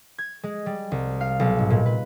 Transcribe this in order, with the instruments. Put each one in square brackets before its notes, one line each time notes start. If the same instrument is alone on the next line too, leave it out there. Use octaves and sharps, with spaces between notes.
[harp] G#6
G#3
G3
C2
F5
B1
G#2
A#2
B4